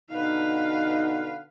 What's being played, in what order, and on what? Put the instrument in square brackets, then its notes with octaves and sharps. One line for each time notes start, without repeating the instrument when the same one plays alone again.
[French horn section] B2 D3 D#4 [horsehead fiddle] B4 F5